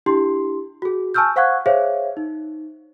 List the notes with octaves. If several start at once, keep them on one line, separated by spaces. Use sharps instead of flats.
D4 E4 G4 C6
F#4 G#4
G#5 A5 C#6 E6 F6 G6
C5 F5 F#5 C#6 F#6 G#6
G#4 C5 C#5 E5 F5
D#4